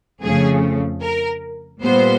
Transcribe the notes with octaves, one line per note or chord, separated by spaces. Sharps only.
F2 C#3 F3 A3 G#4
A#4
A#2 G3 B3 C5